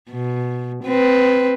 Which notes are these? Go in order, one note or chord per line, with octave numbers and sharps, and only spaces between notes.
B2
C4 B4